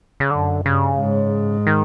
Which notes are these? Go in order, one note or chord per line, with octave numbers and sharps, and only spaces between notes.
C#3
F#2 D3
G2 C#3
G#2
D#3